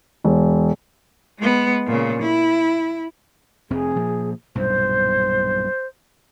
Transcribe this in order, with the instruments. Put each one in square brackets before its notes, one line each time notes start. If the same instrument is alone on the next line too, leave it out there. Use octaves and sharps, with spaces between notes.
[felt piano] E1
[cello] G#3 B3
A#2 C#3
E4
[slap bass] F1 F2 C4 [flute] G#4
[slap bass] A#2 F3
[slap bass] B1 G2 A#2 [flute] C5